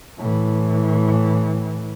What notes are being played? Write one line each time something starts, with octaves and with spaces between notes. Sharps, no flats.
A2 E3